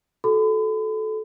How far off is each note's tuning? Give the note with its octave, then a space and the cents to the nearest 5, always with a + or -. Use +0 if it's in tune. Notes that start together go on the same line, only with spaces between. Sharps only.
F#4 +0 A4 -20 B5 +40